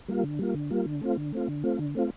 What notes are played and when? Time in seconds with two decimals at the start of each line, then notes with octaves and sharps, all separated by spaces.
0.08 G3 A#3 F4
0.24 D3
0.39 G3 A#3 F4
0.55 D3
0.70 G3 A#3 F4
0.86 D3
1.01 A3 C4 F4
1.17 D3
1.33 A3 C4 F4
1.48 D3
1.64 A3 C4 F4
1.79 D3
1.95 A3 C4 F4